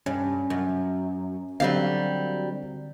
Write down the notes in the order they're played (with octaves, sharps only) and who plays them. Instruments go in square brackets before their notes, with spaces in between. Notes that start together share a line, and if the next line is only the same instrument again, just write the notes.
[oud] G2 [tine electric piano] C#4
[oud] F#2
[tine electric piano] D3 C4 [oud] F#3 G3 F5